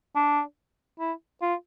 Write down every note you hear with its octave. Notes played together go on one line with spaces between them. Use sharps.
D4
E4
F4